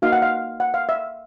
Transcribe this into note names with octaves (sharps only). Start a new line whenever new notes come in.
A#3 D#4 F#4 F5
F#5
F5
F#5
F5
E5